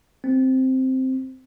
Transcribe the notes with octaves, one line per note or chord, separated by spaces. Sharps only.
C4